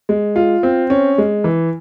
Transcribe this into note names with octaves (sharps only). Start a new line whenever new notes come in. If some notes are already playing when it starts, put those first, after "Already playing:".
G#3
F4
C4
C#4
G#3
E3